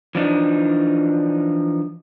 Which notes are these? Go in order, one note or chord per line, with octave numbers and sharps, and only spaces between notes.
E3 F3 D4 D#4